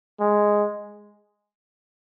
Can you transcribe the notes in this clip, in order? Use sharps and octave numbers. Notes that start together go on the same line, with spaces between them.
G#3